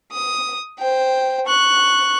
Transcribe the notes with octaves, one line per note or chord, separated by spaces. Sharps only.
D#6
C5 G5
C#6 F#6